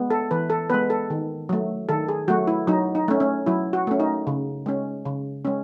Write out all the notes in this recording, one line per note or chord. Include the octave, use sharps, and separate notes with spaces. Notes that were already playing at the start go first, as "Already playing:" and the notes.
Already playing: G#3 B3
A4
E3 B4
A4
G#3 B3 B4
A4
D#3
F#3 A3
D#3 A4
G#4
F#3 A3 F#4
E4
F#3 D#4
D#4
A3 C#4
C#4
F#3 E4
F#4
A3 C#4
D#4
C#3
G#3 C#4
C#3
G#3 C#4